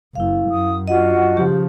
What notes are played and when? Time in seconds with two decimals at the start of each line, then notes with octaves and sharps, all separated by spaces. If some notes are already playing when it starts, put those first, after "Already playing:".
0.15 F#1 E4 F5
0.51 F#2 D#6
0.88 D4 F4 F#4 D#5 F#5
1.37 C#3 F3 G4